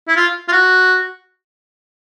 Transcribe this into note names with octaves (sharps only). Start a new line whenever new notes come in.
E4
F4
F4
F#4